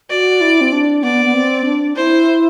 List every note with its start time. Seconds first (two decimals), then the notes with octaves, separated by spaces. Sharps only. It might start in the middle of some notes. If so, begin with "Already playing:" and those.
0.09 F#4 D5
0.41 E4
0.61 C4
0.73 D4
1.03 B3 D5
1.25 B3
1.34 C4
1.65 D4
1.96 E4 C5